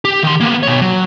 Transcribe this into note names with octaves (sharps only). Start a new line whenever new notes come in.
G4
D#3 C6
A#3 B3
B2 C#5
F#3